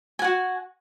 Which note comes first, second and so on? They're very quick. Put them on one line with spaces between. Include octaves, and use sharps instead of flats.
G#5 F#5 F#4